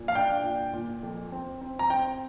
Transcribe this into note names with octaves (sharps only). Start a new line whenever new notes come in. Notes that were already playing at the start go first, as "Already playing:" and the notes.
Already playing: A#2
F5
D4 G5
A#2
A#2
F2
C4
C4
A#5
C4 G5